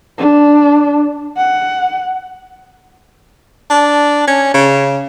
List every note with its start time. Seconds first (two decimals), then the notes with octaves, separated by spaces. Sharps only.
0.18 D4
1.37 F#5
3.70 D4
4.28 C#4
4.54 C#3